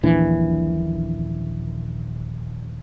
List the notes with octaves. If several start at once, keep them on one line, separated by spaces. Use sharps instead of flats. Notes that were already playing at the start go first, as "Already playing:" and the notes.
D#1 A#1 E3 D4